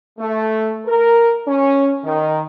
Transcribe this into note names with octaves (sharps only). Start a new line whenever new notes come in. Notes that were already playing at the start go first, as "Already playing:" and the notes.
A3
A#4
C#4
D#3